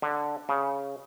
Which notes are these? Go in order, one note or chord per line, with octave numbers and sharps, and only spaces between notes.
D3
C#3